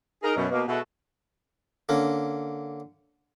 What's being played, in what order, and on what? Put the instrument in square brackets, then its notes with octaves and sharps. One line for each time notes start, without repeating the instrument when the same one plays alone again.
[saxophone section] D#4 G#4 A#4
F#2 B2
B2 A#3
B2 G#3 E4 F#4 A4
[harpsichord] D3 A#3 C#4